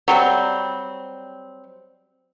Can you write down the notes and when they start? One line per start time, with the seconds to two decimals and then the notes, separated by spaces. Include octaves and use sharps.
0.08 F#3 G3 C4